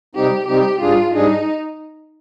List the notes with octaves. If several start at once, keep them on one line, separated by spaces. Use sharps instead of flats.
C3 G3 C4 D#4 G4
C3 G3 C4 D#4 G4
G#2 G3 D4 F4 G#4
G#2 G3 D4 D#4 G#4